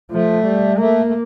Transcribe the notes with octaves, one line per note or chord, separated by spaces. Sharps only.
F3 A3
G3
A3 A#3
A3